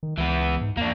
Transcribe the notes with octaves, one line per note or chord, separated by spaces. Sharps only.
D#3
C#2 E3 B3
G#2
E2 A#3 D4